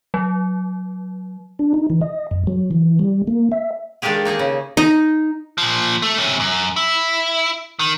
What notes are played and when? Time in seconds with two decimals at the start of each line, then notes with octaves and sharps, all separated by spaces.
0.14 F#3
1.59 D4
1.74 D#4
1.90 E3
2.01 D#5
2.31 F#2
2.47 F#3
2.71 E3
2.99 G3
3.27 A#3
3.52 E5
4.02 D#3 G#3 D4 F4 G4 G#4
4.25 A#3 D#4 G#4 D#5
4.39 C#3
4.77 D#4
5.58 A#2 F3
6.02 A3
6.18 C3 C#4
6.40 F#2
6.76 E4
7.79 D#3